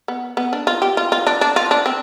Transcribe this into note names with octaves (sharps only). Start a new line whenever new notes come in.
B3
B3
D4
F4
G4
F4
F4
D4
D4
F4
D4
C4